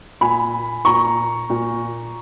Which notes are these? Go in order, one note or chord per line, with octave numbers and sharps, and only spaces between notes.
A#2 G#5 B5
A#2 A#5 C#6
A#2